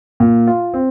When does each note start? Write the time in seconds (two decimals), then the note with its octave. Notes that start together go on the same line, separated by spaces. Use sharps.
0.20 A#2
0.47 F4
0.74 C4